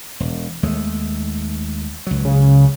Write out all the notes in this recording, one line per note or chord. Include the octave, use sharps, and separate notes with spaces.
E1
D#2 G#3 A3
C#2 F#3
C#3